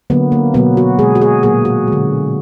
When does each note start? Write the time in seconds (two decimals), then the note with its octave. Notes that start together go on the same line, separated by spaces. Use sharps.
0.10 D3 F#3 A#3 B3
0.32 A#3
0.54 B2 F#3 A#3 B3
0.77 F#4
0.99 B2 G#3 G#4
1.15 F#4
1.21 G#4
1.43 A#2 F#3 A#3 G#4
1.65 F#4
1.87 D3 G#3